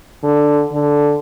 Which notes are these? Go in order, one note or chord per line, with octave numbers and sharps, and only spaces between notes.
D3
D3